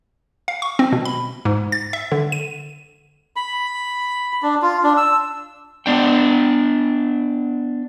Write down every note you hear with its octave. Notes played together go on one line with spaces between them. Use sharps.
F5
C#6
C4
B2
B5
G#2
A6
E5
D3
D#7
B5
D4
F4
D4
E6
B3 D4 G5